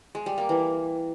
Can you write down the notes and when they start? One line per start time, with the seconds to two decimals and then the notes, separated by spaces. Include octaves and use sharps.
0.15 G#3
0.26 G3
0.38 A#3
0.49 E3